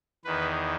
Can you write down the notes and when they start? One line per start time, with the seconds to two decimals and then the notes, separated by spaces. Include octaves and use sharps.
0.25 E2 D#3 B4